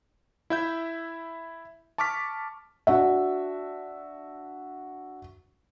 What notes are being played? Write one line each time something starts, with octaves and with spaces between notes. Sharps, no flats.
E4 E5 G6
A5 C#6 D6 F6 B6
D4 F#4 E5